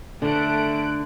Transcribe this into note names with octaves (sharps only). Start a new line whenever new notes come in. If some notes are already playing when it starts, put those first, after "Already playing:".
D3 A3 F#6 D7